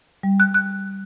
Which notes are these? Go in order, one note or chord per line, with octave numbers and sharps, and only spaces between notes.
G3
F#6
F#6